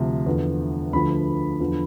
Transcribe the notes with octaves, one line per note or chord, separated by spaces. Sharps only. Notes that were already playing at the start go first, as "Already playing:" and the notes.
Already playing: D2 C3 F3
E2 D3 F3
D2 D3 F3 B5
E2 D3 F3